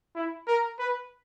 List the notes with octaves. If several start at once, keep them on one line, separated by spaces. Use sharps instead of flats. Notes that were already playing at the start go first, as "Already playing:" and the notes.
E4
A#4
B4